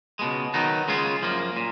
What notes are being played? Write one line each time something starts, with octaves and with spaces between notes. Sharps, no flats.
C#2 B2 G#3
D#3 F#3 B3 D#4
C#3 G#3 C#4 F4
F#2 F3 A#3
A#2